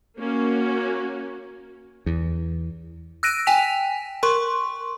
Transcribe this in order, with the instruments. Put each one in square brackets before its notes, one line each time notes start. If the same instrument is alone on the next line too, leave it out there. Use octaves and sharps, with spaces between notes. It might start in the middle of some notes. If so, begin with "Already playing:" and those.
[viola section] A#3 C#4 F#4
[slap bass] E2
[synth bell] E6 F#6 A#6 D7 D#7
G5 G#5 B6 F7
A#4 C6 C#6